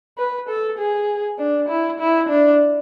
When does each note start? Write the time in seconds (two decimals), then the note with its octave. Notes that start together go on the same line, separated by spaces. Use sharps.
0.18 B4
0.49 A4
0.79 G#4
1.38 D4
1.69 E4
2.00 E4
2.29 D4